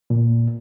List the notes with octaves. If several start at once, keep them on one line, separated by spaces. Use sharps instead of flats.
A#2